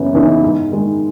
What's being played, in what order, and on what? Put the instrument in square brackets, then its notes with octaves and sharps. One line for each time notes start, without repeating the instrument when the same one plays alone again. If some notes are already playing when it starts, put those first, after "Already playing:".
Already playing: [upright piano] F#2 C#3 E3 B3 D#4
C#3 E3 B3 D#4
G#2
D#3 G#3